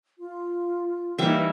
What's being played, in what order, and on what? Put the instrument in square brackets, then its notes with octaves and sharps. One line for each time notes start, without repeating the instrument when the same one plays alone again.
[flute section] F4
[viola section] E3 A#3 D#4 [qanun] G3 E5